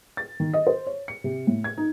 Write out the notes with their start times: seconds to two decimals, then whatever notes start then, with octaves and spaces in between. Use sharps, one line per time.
0.17 A6
0.40 D#3
0.53 D#5
0.67 C5
0.87 C#5
1.08 C#7
1.24 C3
1.47 A2
1.64 G#6
1.78 D#4